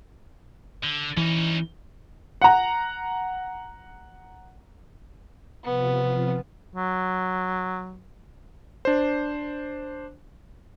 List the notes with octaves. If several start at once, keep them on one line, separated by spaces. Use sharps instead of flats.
D3
E3 C#4 D#4
F#5 A#5
C3 F3 B3 F4
F#3
D4 C5